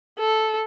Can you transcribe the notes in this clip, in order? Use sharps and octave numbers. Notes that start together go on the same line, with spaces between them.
A4